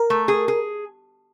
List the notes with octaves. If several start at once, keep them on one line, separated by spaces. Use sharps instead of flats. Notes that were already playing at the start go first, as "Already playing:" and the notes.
Already playing: A#4
A3
G#4
G#4